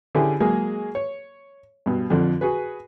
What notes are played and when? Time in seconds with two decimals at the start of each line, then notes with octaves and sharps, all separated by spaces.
0.15 D3 C#4 E4 G4 G#4
0.40 F#3 G#3 A#3 G#4
0.95 C#5
1.86 G2 B2
2.10 F2 D3 F3
2.41 F#4 G#4 B4